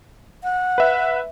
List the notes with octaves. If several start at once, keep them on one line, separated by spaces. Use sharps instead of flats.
F#5
B4 E5